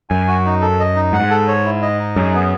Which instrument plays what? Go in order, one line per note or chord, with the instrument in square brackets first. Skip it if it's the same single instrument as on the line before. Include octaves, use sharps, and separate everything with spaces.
[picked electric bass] F#2 [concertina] G#5
[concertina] F#4
D#4
A4
D#5
D#4
[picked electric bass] G#2 [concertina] F#5
[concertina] A4
C#5
E4
D#5
D#4
[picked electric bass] F#2 [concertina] G#4
[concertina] B3